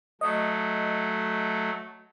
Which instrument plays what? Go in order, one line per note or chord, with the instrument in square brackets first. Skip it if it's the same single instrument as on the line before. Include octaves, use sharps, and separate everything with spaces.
[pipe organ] F#3 A3 [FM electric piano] D#5